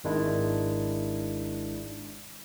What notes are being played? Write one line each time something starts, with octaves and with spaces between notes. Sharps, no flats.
G#1 D#3 G#3 D4 E4